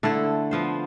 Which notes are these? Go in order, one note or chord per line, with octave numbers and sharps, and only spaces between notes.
D3 A3 E4 A4
F3 B3 F4 C5